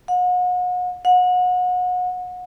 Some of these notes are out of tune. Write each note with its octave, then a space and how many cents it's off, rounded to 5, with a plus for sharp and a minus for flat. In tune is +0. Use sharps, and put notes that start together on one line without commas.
F#5 -40
F#5 -30